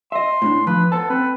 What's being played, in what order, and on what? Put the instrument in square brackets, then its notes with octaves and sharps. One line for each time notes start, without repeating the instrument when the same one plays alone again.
[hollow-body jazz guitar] D#5 E5 [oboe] C6
[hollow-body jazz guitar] A2 C#4 D4
[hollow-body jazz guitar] F3 [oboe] B4
[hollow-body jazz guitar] B3 C5 A5 [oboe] A4
[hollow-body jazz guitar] C4 [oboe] B4